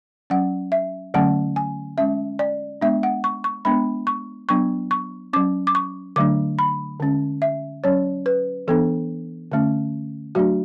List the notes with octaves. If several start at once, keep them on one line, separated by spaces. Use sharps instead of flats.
F#3 C#4 F#5
E5
D3 F#3 A3 C#4 F#5
G#5
G#3 C#4 E5
D5
G#3 B3 D4 E5
F#5
C#6
C#6
G#3 B3 D4 B5
C#6
F#3 B3 D4 C#6
C#6
F#3 C#4 D6
D6
C#6
D3 F#3 A3 D4 D6
B5
D3 G#3 C#4
E5
F#3 C#4 C#5
B4
E3 B3 D4 A4
D3 A3 C#4
F#3 A3 D4 F#4